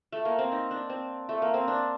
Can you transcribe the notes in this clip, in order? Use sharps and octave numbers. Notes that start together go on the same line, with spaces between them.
A3
A#3
C4
D#4
D4
C4
A3
A#3
C4
D4